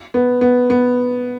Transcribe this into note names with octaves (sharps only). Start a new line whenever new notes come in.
B3
B3
B3